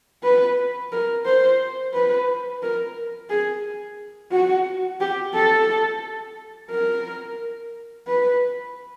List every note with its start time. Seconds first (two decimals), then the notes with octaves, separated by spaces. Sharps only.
0.24 B4
0.92 A#4
1.25 C5
1.94 B4
2.63 A#4
3.30 G#4
4.32 F#4
5.00 G4
5.34 A4
6.71 A#4
8.07 B4